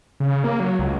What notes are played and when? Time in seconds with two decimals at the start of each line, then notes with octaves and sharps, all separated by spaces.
0.20 C#3
0.44 A#3
0.60 F#3
0.79 C#2